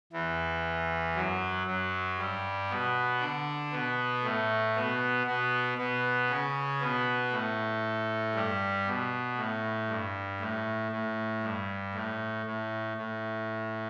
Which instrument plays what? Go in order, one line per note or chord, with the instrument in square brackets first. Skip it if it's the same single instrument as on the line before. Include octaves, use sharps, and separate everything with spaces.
[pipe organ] E2 E3
F#2 F#3
F#2 F#3
G2 G3
B2 B3
D3 D4
B2 B3
A2 A3
B2 B3
B2 B3
B2 B3
C#3 C#4
B2 B3
A2 A3
G2 G3
B2
A2
G2
A2
A2
G2
A2
A2
A2